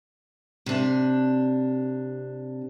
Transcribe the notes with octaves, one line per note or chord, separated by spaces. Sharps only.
C3 D4